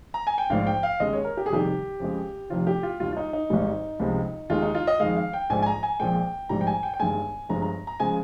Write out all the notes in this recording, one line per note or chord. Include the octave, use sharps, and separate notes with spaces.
A#5
G#5
G5
A#1 G#2 F3 F5
G5
F5
D#2 C#3 G#3 D#5
C#5
A#4
G4
G#4
F2 C3 D#3 G3 G4
F2 C#3 F3 G#3
F1 F2 C3 D#3 F4
G4
F4
D#2 D#3 G3 F4
F4
D#4
D#4
G#1 G#2 G3
C#2 C3 F3 G#3
D#2 D#3 G#3 F4
D#4
F4
D#5
F2 D#3 G#3 F5
F5
G5
A#1 G#2 F3 G#3 G#5
G#5
A#5
G#5
A#1 A#2 F3 G#3 G5
A#1 G#2 G3 A#5
G5
G#5
G5
G5
G1 G2 D#3 G#3 G#5
G1 G2 F3 G#3 A#5
A#5
A#5
C#3 F3 G#3 G#5